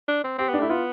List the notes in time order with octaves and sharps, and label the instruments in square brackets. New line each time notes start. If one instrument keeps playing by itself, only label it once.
[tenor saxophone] D4
C4
[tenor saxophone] C4 [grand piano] G4
[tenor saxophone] B3 [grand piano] D4
[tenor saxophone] A3 [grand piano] E4
[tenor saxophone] B3 [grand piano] F4